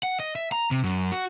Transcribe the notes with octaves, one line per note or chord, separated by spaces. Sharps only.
F#5
D#5
E5
A#5
C3
F#2
F#4